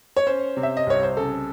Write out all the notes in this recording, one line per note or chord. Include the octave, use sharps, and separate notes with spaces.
C#5
C#4 C5
C3
E5
D#5
C2 C#5
C5
C#3 A4